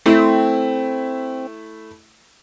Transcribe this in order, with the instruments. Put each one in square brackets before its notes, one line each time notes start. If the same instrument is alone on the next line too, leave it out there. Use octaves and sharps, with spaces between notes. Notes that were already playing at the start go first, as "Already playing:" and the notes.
[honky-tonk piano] A3 E4 [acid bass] C4